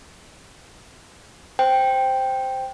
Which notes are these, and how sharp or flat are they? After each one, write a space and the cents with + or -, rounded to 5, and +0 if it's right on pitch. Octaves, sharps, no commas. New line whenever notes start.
C5 +0 G5 +0